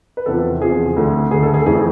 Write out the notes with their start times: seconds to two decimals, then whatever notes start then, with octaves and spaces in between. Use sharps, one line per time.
0.17 B4
0.26 E2 C3 F3 A4
0.61 E2 C3 F3 G#4
0.96 D2 D3 A3
1.31 D2 D3 A3 G#4
1.43 A4
1.54 G#4
1.62 A4
1.66 F2 E3 A3 G#4